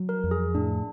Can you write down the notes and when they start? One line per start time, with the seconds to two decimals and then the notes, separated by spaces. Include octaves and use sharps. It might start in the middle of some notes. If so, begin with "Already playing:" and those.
Already playing: F#3
0.09 A#4
0.24 F2
0.31 G#4
0.55 A2 D4